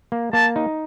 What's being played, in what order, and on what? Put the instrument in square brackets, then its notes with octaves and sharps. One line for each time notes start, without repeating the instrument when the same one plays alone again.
[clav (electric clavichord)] A#3
[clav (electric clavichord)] A#3 [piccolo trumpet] A5
[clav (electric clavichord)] D#4